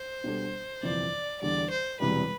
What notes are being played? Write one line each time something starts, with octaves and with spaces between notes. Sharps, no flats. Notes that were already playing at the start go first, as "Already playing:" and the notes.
Already playing: C5
B2 G3 D4 A4
G1 F2 C3 E3 D5
E2 D3 G3 D5
C5
E1 E2 C3 E3 G3 B4